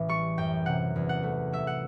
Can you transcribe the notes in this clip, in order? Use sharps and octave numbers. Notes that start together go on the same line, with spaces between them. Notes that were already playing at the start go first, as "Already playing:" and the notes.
Already playing: A1 E3
G3 C#6
F#2 G5
C3 F#5
E2
F#5
A3
F#3 E5
F#5